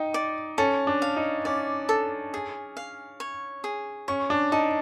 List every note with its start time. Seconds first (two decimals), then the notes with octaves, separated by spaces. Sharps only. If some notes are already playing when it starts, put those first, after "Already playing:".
Already playing: D#4 G5
0.14 D5
0.58 C#4 A4
0.87 D4
1.02 F5
1.16 D#4
1.45 C#4 D5
1.89 A4
2.34 G#4
2.77 F5
3.20 C#5
3.64 G#4
4.08 C#4 C#6
4.30 D4
4.52 D#4 A5